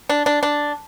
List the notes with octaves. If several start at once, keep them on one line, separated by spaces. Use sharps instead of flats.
D4
D4
D4